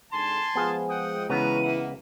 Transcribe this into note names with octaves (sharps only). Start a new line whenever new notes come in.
G#1 D3 G#5 A5 C6
F3 G#3 B3 G#4 F5
F#5 G5 D#6
C#2 C#3 E3 B3 C#4 B4 A#5 D#7
A#3 E5 F#5